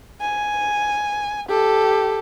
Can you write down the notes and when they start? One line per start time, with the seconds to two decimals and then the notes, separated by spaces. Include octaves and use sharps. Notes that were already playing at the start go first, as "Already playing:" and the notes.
0.21 G#5
1.48 G4 A4